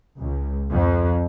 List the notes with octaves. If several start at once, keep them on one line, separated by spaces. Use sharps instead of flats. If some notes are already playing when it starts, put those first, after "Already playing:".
C#2
F2